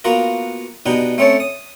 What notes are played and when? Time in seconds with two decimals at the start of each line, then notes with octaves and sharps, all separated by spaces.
0.04 A#3 B3 F4 F#4 A#4
0.86 B2 B3 D4 D#4 G4
1.18 A3 C4 C#4 C#5 A5
1.40 D#6